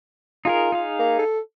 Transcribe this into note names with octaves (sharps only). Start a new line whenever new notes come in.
D#4 F4 G#4 A#4
D#4 G#4 F5
A#3
A4